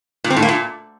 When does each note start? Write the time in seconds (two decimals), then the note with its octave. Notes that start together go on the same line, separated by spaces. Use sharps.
0.24 A#2
0.30 C4
0.36 A2
0.42 A#3
0.48 A#2